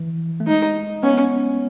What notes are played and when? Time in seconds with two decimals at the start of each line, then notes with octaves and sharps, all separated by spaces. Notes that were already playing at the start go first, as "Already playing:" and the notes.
Already playing: E3
0.40 A3
0.47 G#3 D#4
1.03 B3 C#4